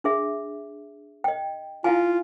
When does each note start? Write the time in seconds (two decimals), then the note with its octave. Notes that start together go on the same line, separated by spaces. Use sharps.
0.04 D4 G#4 E5
1.24 D#5 G5
1.84 E4 F4 F5 G#5